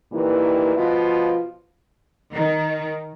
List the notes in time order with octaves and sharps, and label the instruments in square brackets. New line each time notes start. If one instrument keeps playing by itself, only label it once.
[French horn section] G2 A#2 D#3 E3
B2 F3 F4
[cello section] D#3